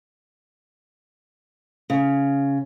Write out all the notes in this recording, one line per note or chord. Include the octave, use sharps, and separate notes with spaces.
C#3